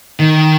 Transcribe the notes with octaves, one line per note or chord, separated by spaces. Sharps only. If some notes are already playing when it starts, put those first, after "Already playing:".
D#3